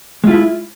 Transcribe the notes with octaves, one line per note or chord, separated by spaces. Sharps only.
G#3 E4 F4